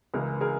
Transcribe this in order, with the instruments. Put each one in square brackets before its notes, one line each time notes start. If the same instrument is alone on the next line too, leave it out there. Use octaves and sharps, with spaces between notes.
[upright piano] C#2 C#3 E3 G#4 A#4
G#4 A#4